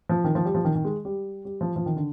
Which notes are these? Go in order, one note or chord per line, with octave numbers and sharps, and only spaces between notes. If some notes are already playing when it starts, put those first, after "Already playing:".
F3
D#3
F3
G3
F3
D#3
D#3
G#3
G3
G3
F3
F3
D#3
D3